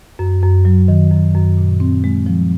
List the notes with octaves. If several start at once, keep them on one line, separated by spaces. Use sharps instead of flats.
F#2
F#2
F#3
D#3
F#2
F#2
A#2
C4
G#3
F3